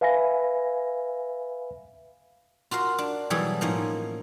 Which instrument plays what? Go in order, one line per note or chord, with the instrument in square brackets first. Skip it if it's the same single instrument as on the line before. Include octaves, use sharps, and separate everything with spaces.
[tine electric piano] B4 E5 F5 G#5 B5 A#6
[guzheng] F4 F#4 A#4 F5
D4
B2 E3 F#3 G3 G#4 A4
A2 F3 A#3 C#4 D#4